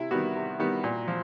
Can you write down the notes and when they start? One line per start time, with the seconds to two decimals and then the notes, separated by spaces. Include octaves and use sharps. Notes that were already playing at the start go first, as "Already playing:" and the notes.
Already playing: C3 E4
0.11 D#3 G3 B3 F#4
0.35 C3
0.59 D#3 G3 B3
0.84 A#2
1.08 F3